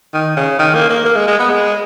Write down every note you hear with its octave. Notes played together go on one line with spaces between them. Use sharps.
D#3
C#3
D#3
A#3
A#3
A#3
G#3
G#3
B3
G#3